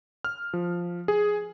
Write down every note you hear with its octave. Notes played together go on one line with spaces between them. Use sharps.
F6
F3
G#4